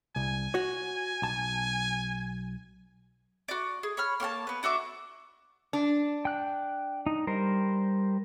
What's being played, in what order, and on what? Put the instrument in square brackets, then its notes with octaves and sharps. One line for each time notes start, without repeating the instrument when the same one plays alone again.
[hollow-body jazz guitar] C2 [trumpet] G#5
[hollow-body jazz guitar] F#4 C#5
B1 A5
[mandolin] F#4 D5
G#4
C#5 B5 F6
A#3 C#5 F#5 A5
B3 B4
D4 F#4 E5 D6
[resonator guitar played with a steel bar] D4
[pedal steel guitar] G5 F#6
D#4
G3 A#4 C5